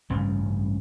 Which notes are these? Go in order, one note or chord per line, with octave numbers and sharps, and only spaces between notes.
A1 G2 C#3 G3